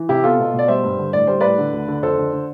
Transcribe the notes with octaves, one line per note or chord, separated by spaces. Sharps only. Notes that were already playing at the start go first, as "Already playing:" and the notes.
Already playing: E3
C3 E4 G4
B3 F4 A4
B2
B2
D5
G3 C5 E5
G2
D3
A2 D5
G3 C5
A2 B4 D5
D3
D2
D3
F2 A4 C5
D3
D3